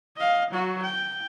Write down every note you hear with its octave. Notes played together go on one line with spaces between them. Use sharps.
D#5 F5
F#3 F#4
G5